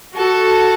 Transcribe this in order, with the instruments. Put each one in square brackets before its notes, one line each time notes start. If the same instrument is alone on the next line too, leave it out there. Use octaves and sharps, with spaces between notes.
[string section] F#4 A4